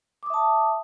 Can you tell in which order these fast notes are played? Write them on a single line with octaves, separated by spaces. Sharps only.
D6 D#6 E5 A5